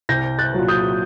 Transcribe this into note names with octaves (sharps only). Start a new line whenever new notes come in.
C2 G6 A#6
F#6 A6
A#2 F#3
D#6 G6